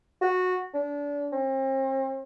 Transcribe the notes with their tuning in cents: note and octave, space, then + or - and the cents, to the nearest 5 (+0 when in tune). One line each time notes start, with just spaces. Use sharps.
F#4 -15
D4 -30
C4 +40